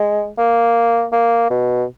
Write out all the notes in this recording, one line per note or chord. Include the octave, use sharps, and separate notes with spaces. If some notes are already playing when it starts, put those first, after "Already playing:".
Already playing: G#3
A#3
A#3
B2